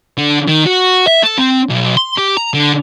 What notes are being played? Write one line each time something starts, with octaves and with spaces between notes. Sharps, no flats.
D3
D#3
F#4
E5
A4
C4
B1
C6
G4
A#5
D3